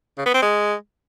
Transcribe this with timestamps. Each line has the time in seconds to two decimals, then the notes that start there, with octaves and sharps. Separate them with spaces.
0.18 C#3
0.26 B3
0.34 C4
0.42 G#3